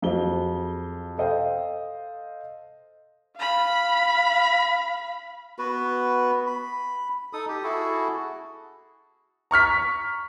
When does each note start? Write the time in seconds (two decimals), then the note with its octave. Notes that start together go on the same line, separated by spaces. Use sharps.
0.02 F2 F#3 G#4 C5 G7
1.18 A4 C5 D#5 F5 G5
3.37 F5 B5
5.59 B3 F#4 B4
6.47 B5
7.33 D#4 A4 D#6
7.48 G4
7.63 E4 F#4 G#4 A4
9.51 A#5 C#6 F6 B6